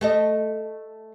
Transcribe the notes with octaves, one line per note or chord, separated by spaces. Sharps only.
A3 A4 D#5